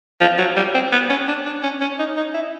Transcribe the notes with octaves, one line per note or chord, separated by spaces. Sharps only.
F3
F#3
G3
C4
B3
C#4
D4
D4
C#4
C#4
D#4
D#4
E4